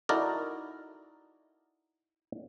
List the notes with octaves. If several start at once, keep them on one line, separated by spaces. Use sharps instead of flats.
D#4 E4 F#4 A4 A#4 D5